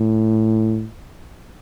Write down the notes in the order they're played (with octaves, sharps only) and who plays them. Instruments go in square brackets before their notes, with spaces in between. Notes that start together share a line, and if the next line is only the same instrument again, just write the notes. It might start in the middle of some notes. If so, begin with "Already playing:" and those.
Already playing: [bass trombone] A2